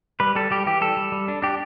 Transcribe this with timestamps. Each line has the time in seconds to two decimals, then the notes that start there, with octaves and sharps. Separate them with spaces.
0.20 G3 B4
0.35 G3 A4
0.51 G3 G4
0.67 E3 G4
0.81 G3 A4
0.97 G3
1.12 G3
1.28 D4
1.42 D4 G4